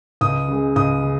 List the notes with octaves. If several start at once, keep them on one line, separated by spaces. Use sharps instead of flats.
C#2 D#6
C#3 G#3
C#2 D#6
C#3